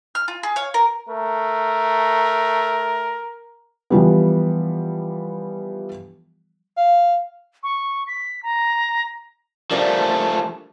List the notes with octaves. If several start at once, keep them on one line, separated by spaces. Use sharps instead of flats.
F6
F4
G#4
C#5 F5
A#4
A3 A#4
E3 F3 G3 B3
F5
C#6
B6
A#5
F3 G3 A3 D4 A#4